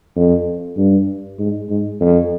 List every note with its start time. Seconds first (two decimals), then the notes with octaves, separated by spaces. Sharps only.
0.16 F2
0.77 G2
1.39 G#2
1.70 G#2
2.01 F2